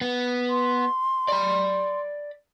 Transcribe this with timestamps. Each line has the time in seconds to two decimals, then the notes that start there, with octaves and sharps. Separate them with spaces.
0.01 B3
0.50 C6
1.28 D5 B5